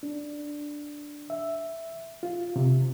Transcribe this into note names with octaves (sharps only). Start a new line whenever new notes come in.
D4
E5
F4
C3